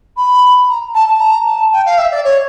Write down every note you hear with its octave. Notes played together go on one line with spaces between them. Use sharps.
B5
A#5
A5
A5
A#5
A5
G5
F5
E5
D5
C#5